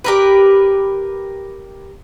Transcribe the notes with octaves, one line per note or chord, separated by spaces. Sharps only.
G4 A#4 B4